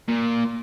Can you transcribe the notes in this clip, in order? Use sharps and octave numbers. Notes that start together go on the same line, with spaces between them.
A#2